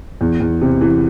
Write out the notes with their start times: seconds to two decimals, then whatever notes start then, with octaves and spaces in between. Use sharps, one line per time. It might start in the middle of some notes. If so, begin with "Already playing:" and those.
0.21 E2
0.40 E2
0.62 C3
0.81 E3